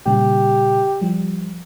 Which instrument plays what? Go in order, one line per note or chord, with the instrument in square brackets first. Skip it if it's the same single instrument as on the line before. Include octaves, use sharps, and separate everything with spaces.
[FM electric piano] A#2 C#3 G3 [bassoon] G4
[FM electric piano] F3 G3